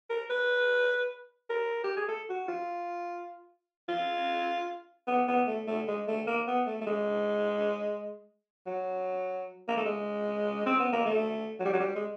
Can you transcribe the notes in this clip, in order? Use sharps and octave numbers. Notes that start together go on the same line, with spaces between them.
A#4
B4
A#4
G4
G#4
A4
F#4
F4
F4
B3
B3
A3
A3
G#3
A3
A#3
B3
A3
A3
G#3
F#3
A#3
A3
G#3
C4
B3
A#3
A3
F#3
G3
F#3
G3
G#3